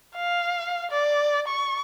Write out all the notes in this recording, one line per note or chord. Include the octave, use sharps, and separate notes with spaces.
F5
D5
C#6